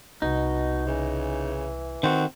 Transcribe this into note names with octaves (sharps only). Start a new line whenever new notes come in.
C2 B2 D#4
C#3 E3
D#3 C4 F#4